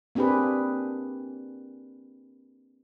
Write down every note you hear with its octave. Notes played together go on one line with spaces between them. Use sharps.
A#3 C4 D4 G4 G#4 B4